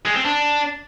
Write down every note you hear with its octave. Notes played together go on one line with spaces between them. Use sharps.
G#3
C4
D4